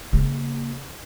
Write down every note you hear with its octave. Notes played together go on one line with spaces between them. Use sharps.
C#3 A#3